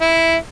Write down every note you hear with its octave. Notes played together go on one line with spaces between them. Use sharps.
E4